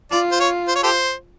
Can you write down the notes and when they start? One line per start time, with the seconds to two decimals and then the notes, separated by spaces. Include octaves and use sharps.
0.11 F4 D5
0.32 C5
0.40 C#5
0.68 C5
0.75 C#5
0.83 G4 A4 C5